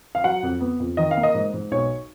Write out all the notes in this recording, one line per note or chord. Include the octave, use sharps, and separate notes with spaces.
F5
F#3 F#5
F2
B3
F2
D#3 D#5
F5
A#3
D#5
G#2
G#2
B1 C#5